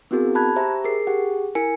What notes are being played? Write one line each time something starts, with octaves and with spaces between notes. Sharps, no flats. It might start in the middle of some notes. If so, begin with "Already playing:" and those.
B3 C4 E4 F#4 G#4 A#4
A5 B5 F#6 G#6
G4 C5 E5 A#5
G#4 A#4 C7
G4 G#4 F#5
E4 A#4 G#5 C#7